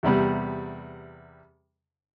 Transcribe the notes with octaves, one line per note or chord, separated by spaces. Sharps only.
E2 C3 G3 B3